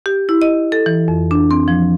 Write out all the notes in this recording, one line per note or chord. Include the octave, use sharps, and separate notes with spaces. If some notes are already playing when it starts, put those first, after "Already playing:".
G4
E4
D#5
A4
E3
F2
D4
C4
F3